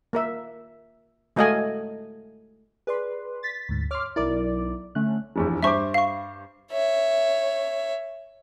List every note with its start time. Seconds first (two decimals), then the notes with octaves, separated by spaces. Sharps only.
0.13 A#3 A#4 E5
1.36 G#3 A3 F#4 D#5 F5 G#5
2.87 G#4 B4 D5 C6
3.43 A6 B6
3.69 D2 G#2
3.91 C#5 C6 D6 F6
4.16 B1 E4 A#4 D5 D6
4.95 D3 A3 C#4 F#6
5.36 F1 A#1 E2
5.63 G2 C5 E5 C#6 D6
5.94 F5 C#6
6.72 C#5 E5